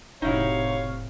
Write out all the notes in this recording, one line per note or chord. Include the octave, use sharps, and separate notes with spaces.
F1 A2 C3 D#4 E4 F#4 C#5 F5